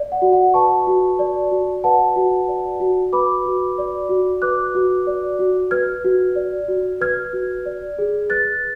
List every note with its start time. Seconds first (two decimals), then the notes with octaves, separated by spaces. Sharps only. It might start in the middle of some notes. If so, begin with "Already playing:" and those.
Already playing: D5
0.12 F#5
0.22 F#4
0.33 F#5
0.54 B4 A5 C#6
0.87 F#4
1.19 D5
1.52 F#4
1.84 B4 F#5 A5
2.16 F#4
2.48 D5
2.80 F#4
3.13 B4 B5 D6
3.46 F#4
3.78 D5
4.09 F#4
4.42 B4 D6 F#6
4.75 F#4
5.07 D5
5.39 F#4
5.71 B4 F6 G#6
6.05 F#4
6.36 D5
6.68 F#4
7.01 B4 F6 G#6
7.33 F#4
7.66 D5
7.99 G#4
8.30 B4 F#6 A6